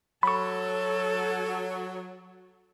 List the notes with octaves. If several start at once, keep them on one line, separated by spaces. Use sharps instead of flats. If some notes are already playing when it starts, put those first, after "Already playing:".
F#3 A4 B5 C#6